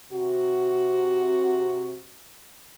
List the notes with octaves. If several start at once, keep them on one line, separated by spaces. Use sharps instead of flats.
C3 F#4